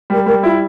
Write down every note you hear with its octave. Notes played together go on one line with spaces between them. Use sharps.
G3 A#4
G3 A#4
E4 F4